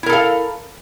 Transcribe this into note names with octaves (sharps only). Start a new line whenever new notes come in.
E4 A4 A#4 F5